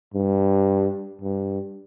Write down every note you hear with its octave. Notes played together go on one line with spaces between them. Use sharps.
G2
G2